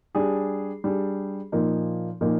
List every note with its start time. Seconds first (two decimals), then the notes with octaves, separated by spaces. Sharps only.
0.15 G3 D4 G#4
0.84 G3 D4 G#4
1.52 A#2 F3 A#3 D#4
2.21 A#2 F3 A#3 D#4